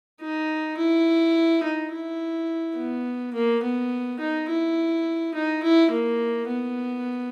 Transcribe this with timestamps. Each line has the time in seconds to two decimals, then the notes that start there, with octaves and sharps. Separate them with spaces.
0.21 D#4
0.78 E4
1.63 D#4
1.92 E4
2.77 B3
3.34 A#3
3.63 B3
4.20 D#4
4.49 E4
5.34 D#4
5.63 E4
5.91 A#3
6.48 B3